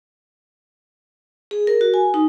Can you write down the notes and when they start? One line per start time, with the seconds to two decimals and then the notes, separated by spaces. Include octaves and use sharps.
1.51 G#4
1.67 A#4
1.81 F#4
1.94 G#5
2.14 D#4